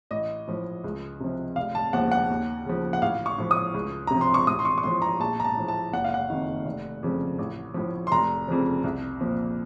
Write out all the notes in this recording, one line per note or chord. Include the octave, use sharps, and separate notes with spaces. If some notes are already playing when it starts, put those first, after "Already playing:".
A1 D#5
A2 F3
C#2
C3 F3
F1 F5
A5
D#2 C#3 F3 F#5
F#5
D#2
C#3 F3
F#5
A1 F5
C#6
A2 F3
D#6
C#2
C3 A#5
F3
C6
C#6
A1 D#6
C6
C#6
C#6
A2 F3 C6
A#5
A#1 A5
A#5
A5
A2 F3
A5
F#1 F#5
F5
F#5
F2 D#3
F1
F2 C#3 F3
A1
A2 F3
C6
F1 A#5
F2 C#3 F3
C2
A#2 F3